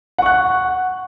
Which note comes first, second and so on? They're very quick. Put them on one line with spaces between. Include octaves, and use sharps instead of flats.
F#5 C#6 F#6